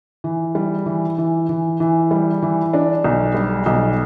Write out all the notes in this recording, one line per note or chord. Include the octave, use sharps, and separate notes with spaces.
E3
G3
E3
E3
E3
E3
G3
E3
D4
B1
G3
B1